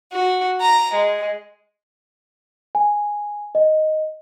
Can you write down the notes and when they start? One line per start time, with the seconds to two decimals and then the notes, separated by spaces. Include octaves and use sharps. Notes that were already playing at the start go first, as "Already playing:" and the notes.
0.11 F#4
0.60 A#5
0.94 G#3
2.75 G#5
3.55 D#5